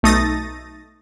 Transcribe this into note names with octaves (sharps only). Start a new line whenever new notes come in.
B1 A3 D#4 D#6 A6 A#6